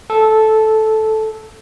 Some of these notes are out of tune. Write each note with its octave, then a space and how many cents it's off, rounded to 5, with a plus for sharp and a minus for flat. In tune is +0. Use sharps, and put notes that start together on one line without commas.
A4 -10